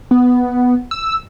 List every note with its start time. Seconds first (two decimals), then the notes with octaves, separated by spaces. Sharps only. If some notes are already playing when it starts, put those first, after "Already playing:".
0.11 B3
0.91 E6